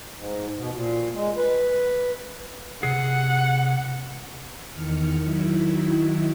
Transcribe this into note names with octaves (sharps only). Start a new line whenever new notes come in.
G#2
B2
A#2
G#3
B4
C3 G#4 F#5
E2 D#3 F6 C#7
D#3 F#3 E4